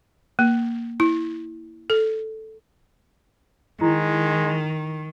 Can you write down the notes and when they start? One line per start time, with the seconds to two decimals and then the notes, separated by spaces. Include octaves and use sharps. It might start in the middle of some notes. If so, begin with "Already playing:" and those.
0.39 A#3
1.00 E4
1.90 A4
3.81 D#3 G#3 E4